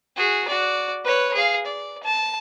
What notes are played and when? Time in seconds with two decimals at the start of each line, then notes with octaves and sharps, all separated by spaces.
0.17 F#4 G#4
0.48 F#4 D5
1.04 B4 C#5
1.34 G#4 F5
1.66 D5
2.03 A5